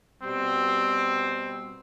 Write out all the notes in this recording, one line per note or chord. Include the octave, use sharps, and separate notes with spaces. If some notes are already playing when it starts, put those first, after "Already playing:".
B2 G3 C4